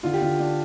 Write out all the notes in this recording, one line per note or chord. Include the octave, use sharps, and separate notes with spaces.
D3 F4
G4
D3 F4
D4